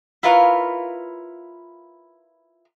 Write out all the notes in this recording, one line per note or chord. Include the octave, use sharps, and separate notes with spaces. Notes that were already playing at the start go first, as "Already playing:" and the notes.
E4 F4 A#4 B4 C#5 F5